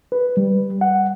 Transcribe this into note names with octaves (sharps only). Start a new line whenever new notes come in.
B4
G3
F#5